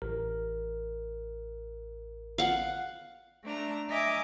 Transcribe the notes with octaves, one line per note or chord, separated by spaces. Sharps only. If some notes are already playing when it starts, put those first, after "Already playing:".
A1 A#4
F5 F#5
A3 D4 A#5
D#5 E5 G#5 A#5 D6 D#6